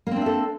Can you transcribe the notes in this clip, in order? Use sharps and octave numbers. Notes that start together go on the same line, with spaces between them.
A#3 C4 D4 A4 E5